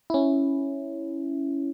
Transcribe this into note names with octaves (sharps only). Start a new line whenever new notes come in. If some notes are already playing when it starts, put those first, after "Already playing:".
C#4 E4